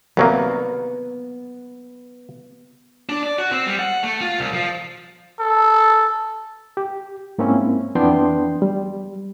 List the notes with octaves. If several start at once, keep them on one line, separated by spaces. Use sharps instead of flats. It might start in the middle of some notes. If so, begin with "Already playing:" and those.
C2 F#3 A#3 B3
D4
D5
F#4
C4
G3
F#5
A3
F4
C2
F3
A4
G4
G#2 A#3 C4 C#4 E4
F2 E3 B3 D4 G5 C6
G3